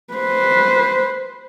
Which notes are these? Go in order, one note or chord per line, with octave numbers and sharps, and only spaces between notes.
B4 C5